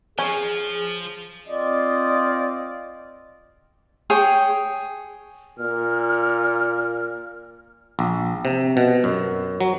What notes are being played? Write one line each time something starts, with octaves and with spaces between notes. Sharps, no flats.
F3 C#4 G#4
C4 F4 D5 D#5
G#4 C#5 G5
A#2 F6
A#1
C3
B2
F#2
F#3